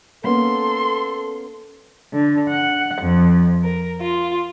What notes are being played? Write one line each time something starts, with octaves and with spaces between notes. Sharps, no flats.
A#3 B3 C#4 A4 C6
D3
F#5
F2
A#4
F4